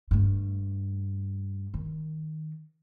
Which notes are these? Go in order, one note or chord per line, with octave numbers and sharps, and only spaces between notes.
G2 A3
D#3